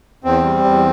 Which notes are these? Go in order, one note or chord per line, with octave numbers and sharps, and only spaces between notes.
E2 C4
G3
E2